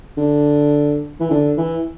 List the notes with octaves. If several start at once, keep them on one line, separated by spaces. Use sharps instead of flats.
D3
E3
D3
E3